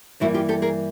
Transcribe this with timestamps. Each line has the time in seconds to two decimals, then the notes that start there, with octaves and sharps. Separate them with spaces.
0.20 G2 E3 G3 A#3 E4 F#4
0.34 F4 G4
0.49 G4 A4
0.62 G#4 A#4